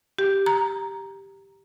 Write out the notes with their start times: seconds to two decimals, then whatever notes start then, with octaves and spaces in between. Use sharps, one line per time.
0.19 G4
0.46 A#5